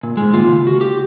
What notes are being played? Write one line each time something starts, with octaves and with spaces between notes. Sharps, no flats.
A#2
G#2 G#3
D#3 A#3 F4
C#3
F#4
G4